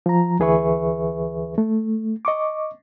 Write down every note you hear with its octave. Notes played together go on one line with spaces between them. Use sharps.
F3 A#5
D2 E3 G#4 B4 E5 C#6
A3
D#5 C#6 D6